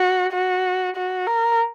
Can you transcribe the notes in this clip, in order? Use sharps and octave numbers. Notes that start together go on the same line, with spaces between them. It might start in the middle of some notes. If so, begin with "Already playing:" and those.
Already playing: F#4
F#4
F#4
A#4